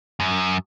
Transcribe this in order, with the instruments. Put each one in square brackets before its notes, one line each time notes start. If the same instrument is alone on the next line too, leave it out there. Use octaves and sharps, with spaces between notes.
[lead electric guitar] F#2